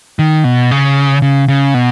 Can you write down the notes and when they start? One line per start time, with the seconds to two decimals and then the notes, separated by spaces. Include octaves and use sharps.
0.19 D#3
0.44 B2
0.71 C#3
1.22 C#3
1.48 C#3
1.74 B2